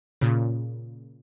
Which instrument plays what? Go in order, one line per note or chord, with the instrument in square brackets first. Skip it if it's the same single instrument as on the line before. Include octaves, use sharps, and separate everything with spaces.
[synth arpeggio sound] A#2 C#3